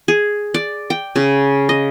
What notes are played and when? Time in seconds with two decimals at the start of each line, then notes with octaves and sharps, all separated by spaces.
0.08 G#4
0.54 D5
0.90 G5
1.16 C#3
1.69 D#5